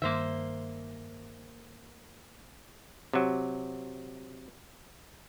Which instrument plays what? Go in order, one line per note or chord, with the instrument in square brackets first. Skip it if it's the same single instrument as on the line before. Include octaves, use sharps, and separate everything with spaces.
[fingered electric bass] G2 D#3 [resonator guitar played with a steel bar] A#3 C5 E5
[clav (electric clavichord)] C3 F#3